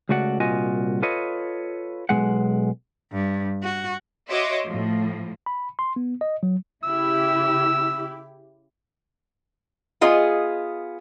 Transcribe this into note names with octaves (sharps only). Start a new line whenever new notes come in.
C#2 C#3 A3 F#4 D5 F#5
C2 A#2 F4 F#4 D#5 G#5
F4 A4 B4 C#5 D#5
B1 G2 B2 G#3 F#5
G2
F#4
F#4 C#5 D#5 E5 C6 D6
A2 F3
B5
C6
B3
D#5
F#3
C#3 E4 G4 E6
B3 F4 G#4 D#5